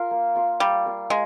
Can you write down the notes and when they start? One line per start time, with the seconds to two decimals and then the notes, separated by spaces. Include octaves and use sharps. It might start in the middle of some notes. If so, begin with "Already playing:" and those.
Already playing: F4 A#4 F5
0.11 A#3
0.35 F4 A#4 F5
0.60 G3 A#3
0.86 F4 A#4 F5
1.10 G#3 A#3